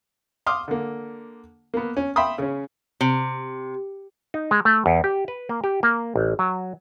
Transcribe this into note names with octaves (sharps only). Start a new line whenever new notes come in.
C6 D6 D#6 F6
D3 A#3
A#3 B3
C#4
E5 G5 B5 C6 D#6
C#3 C#4
C3
D#4
G#3
A3
E2
G4
B4
A#3
G4
A#3
A1
F#3